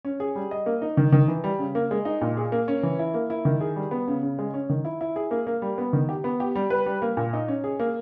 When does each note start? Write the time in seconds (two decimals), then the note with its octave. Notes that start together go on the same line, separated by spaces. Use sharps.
0.05 C#4
0.20 G#4
0.35 G3
0.51 D#5
0.66 A#3
0.82 D#4
0.97 D#3
1.12 D#3
1.28 E3
1.44 G3
1.59 C#3
1.75 A#3
1.91 G#3
2.05 D#4
2.21 A#2
2.37 G#4
2.52 A#3
2.68 C#4
2.83 E3
2.99 E4
3.14 A#3
3.30 E4
3.45 D#3
3.61 G#4
3.76 G3
3.91 B3
4.08 C#3
4.23 C#3
4.39 G#3
4.54 C#4
4.70 D#3
4.85 E4
5.01 E4
5.16 G#4
5.31 A#3
5.47 A#3
5.62 G3
5.78 B3
5.93 D#3
6.09 G4
6.24 B3
6.40 G4
6.55 G3
6.70 B4
6.86 G3
7.02 A#3
7.17 A#2
7.33 D#4
7.48 C#4
7.64 G#4
7.80 A#3